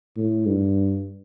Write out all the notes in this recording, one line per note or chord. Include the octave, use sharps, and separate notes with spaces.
A2
G2